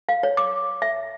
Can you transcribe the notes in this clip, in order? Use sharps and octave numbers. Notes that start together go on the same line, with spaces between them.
F5
C#5
D6
E5